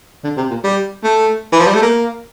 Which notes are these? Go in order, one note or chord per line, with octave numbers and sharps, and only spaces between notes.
D3
C3
A#2
G3
A3
E3
F3
G3
A3
A#3